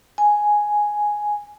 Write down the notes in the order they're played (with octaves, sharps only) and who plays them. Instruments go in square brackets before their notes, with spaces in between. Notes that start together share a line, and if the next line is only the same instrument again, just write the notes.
[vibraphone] G#5